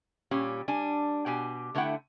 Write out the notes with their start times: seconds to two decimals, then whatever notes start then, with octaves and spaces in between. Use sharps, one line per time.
0.31 A#2 G3 C#4 G4
0.68 G3 D4 G#5
1.26 B2 G4 G#5
1.75 D3 A3 B3 E4 F#5 G5